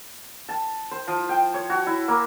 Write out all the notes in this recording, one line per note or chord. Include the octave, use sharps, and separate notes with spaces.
A5
C5
F3
G5
C#5
F#4
E4
A#3